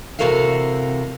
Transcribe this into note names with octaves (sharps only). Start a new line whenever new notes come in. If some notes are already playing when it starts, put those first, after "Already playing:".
C3 E3 F#4 A4 A#4 F5